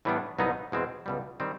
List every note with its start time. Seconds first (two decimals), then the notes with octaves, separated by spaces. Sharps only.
0.05 A2 E3 G3 B3 D4
0.39 C2 B2 F#3 B3 D#4
0.72 E2 B2 G#3 C4
1.06 C#2 B2 G3
1.40 D#3 G3 C4